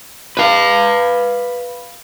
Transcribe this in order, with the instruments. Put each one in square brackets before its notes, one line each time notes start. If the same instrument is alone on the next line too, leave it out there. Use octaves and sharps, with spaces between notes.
[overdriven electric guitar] B4 F5